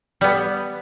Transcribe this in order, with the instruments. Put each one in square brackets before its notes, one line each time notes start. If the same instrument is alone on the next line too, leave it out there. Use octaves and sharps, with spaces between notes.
[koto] G3 B3